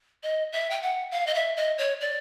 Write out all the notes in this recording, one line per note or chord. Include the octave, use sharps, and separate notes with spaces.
D#5
E5
G5
F#5
F5
D#5
E5
D#5
C#5
D5